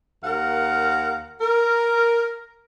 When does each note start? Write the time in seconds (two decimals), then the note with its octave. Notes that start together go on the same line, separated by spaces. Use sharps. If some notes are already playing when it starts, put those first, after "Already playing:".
0.24 D#2 A#4 F5 F#5
1.41 A#4